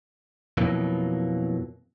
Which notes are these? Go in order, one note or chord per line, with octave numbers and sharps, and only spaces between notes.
F2 B2 E3 F#3 A#3